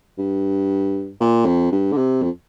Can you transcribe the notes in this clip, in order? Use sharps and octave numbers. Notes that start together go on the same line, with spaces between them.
G2
A#2
F2
G2
D3
C3
F2